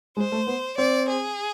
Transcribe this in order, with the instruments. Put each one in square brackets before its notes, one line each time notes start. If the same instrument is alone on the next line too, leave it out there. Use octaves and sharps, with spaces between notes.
[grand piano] G#3 [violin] C5
[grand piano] A3
B3
[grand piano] C4 [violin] D5
[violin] G#4